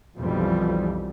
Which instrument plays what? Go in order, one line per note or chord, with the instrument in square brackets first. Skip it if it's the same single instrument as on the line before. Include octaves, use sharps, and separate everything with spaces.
[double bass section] B1 F2 E3 G3